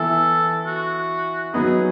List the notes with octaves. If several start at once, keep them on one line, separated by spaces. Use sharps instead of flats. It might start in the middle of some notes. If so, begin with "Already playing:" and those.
Already playing: E3 B3 E4 A4
F#4
F#3 B3 D#4 G#4